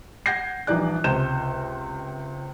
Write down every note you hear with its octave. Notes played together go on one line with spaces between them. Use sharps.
F#5 G6 G#6 A#6 C7
A#1 E3 G3 D#4 D5 F#6
C#2 C3 C5 G6 E7